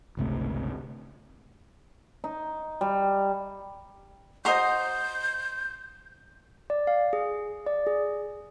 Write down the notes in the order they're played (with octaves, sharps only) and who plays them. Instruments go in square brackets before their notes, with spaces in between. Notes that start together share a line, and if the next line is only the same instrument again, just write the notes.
[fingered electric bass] G1 C#2 C3 A3
[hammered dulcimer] D#4
G3
[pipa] F#4 D#5 [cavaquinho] C5 A#5 C6 [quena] G6
[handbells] D5
F5
G#4
D5
G#4